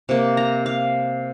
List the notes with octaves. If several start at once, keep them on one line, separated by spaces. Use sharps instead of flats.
C3 A#3
A#5
F5